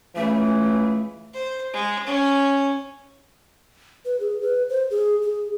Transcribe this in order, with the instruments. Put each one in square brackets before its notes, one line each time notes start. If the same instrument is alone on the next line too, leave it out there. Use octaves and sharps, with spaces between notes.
[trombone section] C#2 C#3 E3 [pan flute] A3
[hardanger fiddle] C5
G#3
C#4
[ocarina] B4
G#4
B4
C5
G#4
G#4